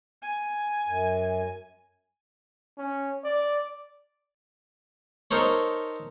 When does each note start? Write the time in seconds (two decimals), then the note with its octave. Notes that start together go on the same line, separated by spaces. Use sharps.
0.22 G#5
0.87 F#2
2.77 C#4
3.24 D5
5.31 D#4 A4 A#4 C5 C#5